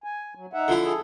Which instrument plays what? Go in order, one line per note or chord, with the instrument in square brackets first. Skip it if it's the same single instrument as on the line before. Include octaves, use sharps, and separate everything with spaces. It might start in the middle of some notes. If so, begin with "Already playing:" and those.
[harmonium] G#5
F#3
D#4 E5 F#5
[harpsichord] D3 F3 E4
[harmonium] G#4 A4